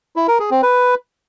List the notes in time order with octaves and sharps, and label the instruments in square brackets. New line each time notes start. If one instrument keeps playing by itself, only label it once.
[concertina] E4
A#4
G#4
C4
B4